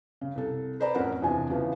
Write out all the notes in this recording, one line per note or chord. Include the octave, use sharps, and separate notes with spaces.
C#3
C2 A4
B4 C5 D5 A#5 B5
A1 F2 C#4 A#4 F#5
E2 C3 F3 D4 G#5
C#3 E3 F3 B3